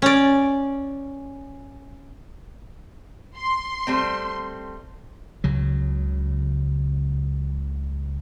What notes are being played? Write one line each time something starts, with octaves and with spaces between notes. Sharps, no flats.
C#4 D5
C6
G3 A3 C4
C#2 C#3 F#3